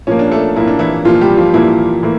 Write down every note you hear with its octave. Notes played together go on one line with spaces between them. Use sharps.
A#2 F3 A#3 C#4
D4
A3 A4
A#2 F3 A#3 E4
D4
E3 E4
A#2 F3 A#3 F4
G3 G4
F3 F4
A#2 E3 F3 A#3 E4
A2 E3 A#3